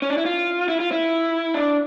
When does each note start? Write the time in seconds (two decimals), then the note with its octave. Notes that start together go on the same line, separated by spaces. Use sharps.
0.02 C#4
0.10 D4
0.18 E4
0.26 F4
0.69 E4
0.80 F4
0.92 E4
1.54 D4